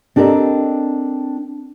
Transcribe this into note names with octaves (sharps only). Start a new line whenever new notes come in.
C4 D4 G4 A4 A#4 D#5